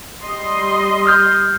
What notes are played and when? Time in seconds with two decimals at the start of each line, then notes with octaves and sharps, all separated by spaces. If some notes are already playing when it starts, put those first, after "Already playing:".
0.22 G3 D#5 C6
1.06 D#6 F6 G6